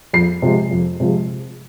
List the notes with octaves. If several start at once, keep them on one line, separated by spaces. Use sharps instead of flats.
F2 C7
C3 F3 G#3
F2
C3 F3 G#3